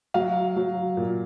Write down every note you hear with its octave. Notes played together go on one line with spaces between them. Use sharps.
F#3 F5
F#3
A#2